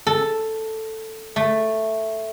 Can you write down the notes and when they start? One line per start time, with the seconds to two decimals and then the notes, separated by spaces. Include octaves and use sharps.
0.07 A4
1.36 A3